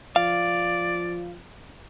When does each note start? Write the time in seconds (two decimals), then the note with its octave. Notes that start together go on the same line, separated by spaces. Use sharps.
0.16 F3 D5 F5